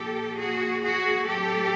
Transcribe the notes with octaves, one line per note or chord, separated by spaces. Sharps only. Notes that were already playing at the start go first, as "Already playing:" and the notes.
Already playing: A#2 F3 A#3 G4 A4
F#4 G#4
F#4 G#4
A2 F#3 A3 C4 G4 A4